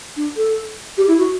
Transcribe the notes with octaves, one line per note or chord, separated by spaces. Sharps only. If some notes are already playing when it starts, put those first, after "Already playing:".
D4
A4
G4
E4
F#4